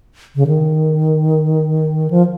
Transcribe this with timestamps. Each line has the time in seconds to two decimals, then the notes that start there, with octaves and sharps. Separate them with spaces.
0.36 C#3
0.47 D#3
2.10 F3